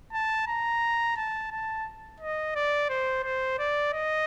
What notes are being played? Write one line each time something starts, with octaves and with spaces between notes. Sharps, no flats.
A5
A#5
A5
A5
D#5
D5
C5
C5
D5
D#5